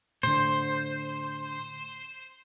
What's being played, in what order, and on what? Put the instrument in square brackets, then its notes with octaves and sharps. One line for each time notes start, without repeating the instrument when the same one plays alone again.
[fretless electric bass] A2 D3 [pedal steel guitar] C5